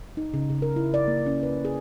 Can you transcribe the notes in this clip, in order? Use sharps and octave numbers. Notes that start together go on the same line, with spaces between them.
D#4
C#3
C#3
A#4
E4
D5
A#3
C#4
B4
G#4